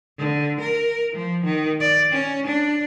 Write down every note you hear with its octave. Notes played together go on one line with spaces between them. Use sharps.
D3
A#4
F3
D#3
D5
C#4
D4